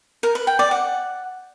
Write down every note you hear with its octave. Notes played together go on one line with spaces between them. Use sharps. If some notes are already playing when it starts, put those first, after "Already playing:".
A#4
B4
G5
D5
F#5